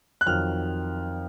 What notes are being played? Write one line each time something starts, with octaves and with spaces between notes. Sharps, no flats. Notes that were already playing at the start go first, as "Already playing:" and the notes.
F#6
F2 D#3 F#3 F6